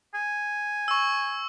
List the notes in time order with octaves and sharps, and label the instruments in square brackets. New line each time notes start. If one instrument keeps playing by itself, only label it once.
[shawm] G#5
[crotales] C#6 E6